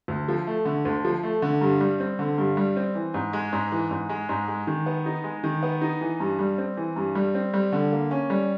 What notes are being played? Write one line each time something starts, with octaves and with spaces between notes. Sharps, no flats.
D2
F3
A3
D3
D2
F3
A3
D3
G2
G3
C4
D3
G2
G3
C4
E3
G#2
G#3
G#2
E3
G#2
G#3
G#2
G#3
D#3
B3
D#4
G#3
D#3
B3
D#4
E3
G2
G3
C4
E3
G2
G3
C4
G3
D3
A#3
C#4
G3